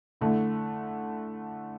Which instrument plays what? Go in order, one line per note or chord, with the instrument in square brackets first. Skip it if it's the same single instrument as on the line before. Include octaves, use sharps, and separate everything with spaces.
[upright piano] D3 A3 E4